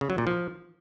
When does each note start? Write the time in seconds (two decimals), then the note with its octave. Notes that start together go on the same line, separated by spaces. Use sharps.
0.01 C#3
0.10 F#3
0.18 A#2
0.27 F3